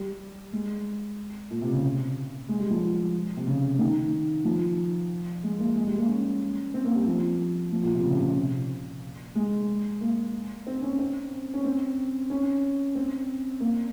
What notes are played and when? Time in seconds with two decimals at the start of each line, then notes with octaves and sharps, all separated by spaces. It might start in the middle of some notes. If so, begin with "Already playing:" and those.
Already playing: G3
0.53 G#3
1.51 A#2
1.61 C3
1.72 C#3
2.49 G#3
2.60 G3
2.70 F3
3.36 C3
3.47 C#3
3.79 D#3
4.45 F3
5.44 G#3
5.59 A#3
5.75 G#3
5.87 G3
5.98 A#3
6.08 C#4
6.74 C4
6.85 A#3
6.95 G3
7.06 F3
7.73 F3
7.83 A#2
7.94 C3
8.04 C#3
8.13 C3
8.21 C#3
8.30 C3
9.35 G#3
10.01 A#3
10.67 C4
10.82 C#4
10.99 C4
11.54 C#4
11.65 C4
12.30 C#4
12.95 C4
13.60 A#3